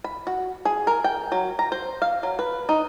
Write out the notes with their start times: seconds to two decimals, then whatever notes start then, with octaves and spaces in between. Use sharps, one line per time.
0.04 B5
0.27 F#4
0.65 G#4
0.87 A#4
1.04 G5
1.32 F#3
1.59 A#5
1.72 C5
2.02 F5
2.23 F#3
2.39 B4
2.69 D#4